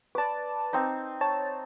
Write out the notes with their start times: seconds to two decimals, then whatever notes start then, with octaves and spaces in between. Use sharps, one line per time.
0.15 B4 D5 A5 D6
0.73 C4 D#4
1.21 C#5 A5